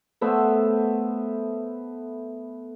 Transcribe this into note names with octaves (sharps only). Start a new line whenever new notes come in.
A3 B3 C5 E5